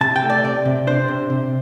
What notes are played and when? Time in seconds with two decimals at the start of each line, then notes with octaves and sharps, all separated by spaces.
0.01 C3 A5
0.16 G5
0.22 A3
0.30 D5
0.44 C3 D5
0.65 C3
0.87 D4 C5
1.08 C3
1.30 C3